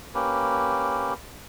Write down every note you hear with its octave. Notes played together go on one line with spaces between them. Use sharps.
A#3 C#4 G4 B4